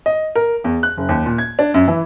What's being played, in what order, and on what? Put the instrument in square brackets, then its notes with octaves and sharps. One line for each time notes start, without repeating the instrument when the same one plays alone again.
[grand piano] D#5
A#4
E2
F#6
F#1
D#2
A#2
G#6
D4
F#2
E3